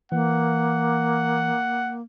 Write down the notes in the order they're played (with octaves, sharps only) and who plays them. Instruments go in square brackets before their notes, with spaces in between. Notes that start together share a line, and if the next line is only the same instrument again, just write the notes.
[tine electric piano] E3 [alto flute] A#3 [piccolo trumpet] F#5